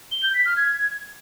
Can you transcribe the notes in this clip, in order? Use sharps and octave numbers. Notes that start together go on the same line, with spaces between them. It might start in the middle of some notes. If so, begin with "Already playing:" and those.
G7
G6
B6
F6
G#6